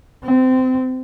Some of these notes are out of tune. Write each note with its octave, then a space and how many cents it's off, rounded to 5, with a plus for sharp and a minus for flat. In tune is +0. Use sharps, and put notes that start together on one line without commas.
C4 -25